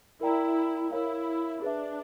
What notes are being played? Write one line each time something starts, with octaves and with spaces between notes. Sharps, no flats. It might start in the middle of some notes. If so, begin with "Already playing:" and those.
E4 A#4 D5 G5 A#5
E4 A#4 C#5 F5
D4 G#4 B4 E5